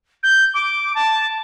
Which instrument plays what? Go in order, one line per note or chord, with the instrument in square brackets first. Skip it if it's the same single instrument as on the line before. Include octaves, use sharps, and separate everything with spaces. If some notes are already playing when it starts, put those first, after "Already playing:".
[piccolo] G6
D6
A5